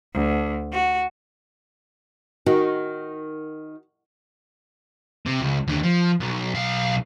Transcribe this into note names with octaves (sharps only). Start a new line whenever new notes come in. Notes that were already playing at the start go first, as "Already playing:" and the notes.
D2
F#4
D#3 F#4
C3
C#2
D#2 D3
F3
B1
B1 F5